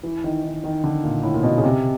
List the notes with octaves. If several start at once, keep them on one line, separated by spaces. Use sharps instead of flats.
E3
D#3
D#3
D#3
D3
A#2
A2
A#2
B2
C#3
C3